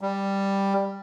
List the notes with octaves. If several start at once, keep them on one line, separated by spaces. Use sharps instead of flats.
G3